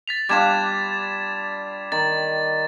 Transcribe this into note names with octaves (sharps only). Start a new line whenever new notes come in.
A6 B6 F7
G3 D4 F4 D6 G#6 E7
D#3 A6